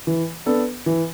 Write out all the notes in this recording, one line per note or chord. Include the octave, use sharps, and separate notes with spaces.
E3
B3 D4 A4
E3